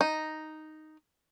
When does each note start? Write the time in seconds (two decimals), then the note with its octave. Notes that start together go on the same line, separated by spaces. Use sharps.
0.01 D#4